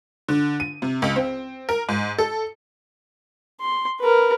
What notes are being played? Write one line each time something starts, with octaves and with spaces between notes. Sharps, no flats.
D3
D#7
C3
C#2
C4
A#4
G#2
A4
C6
A#4 B4